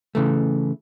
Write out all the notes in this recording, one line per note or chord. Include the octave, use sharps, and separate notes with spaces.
C#3 E3 A3